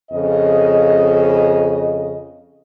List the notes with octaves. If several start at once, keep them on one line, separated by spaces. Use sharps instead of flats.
F2 C#3 D#5